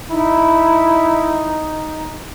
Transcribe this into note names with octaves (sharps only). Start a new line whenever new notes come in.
D#4 E4